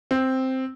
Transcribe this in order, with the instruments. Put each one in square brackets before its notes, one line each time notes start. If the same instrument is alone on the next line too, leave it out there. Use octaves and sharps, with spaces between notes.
[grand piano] C4